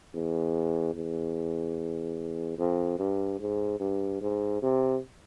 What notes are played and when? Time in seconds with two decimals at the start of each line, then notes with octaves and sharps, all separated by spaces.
0.14 E2
0.95 E2
2.58 F2
2.99 G2
3.40 G#2
3.80 G2
4.21 G#2
4.62 C3